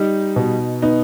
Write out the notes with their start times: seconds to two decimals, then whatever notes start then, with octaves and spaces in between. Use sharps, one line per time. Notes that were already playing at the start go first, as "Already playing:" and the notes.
Already playing: G3 D#4
0.36 B2
0.82 B3 D#4